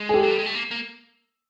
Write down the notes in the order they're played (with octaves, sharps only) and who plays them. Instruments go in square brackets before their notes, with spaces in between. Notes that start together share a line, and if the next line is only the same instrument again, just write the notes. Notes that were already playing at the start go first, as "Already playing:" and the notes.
Already playing: [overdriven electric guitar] G#3
[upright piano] G#4
G4 A4
[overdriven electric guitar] F#3
G3
G#3
A3
A#3
A#3